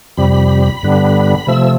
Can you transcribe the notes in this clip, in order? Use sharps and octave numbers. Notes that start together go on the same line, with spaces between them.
F2 C3 G3 B5
G2 D3 G3 B3
C3 F3 A3 E6